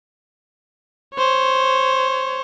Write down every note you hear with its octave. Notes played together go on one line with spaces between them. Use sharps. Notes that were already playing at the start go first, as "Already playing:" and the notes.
C5 C#5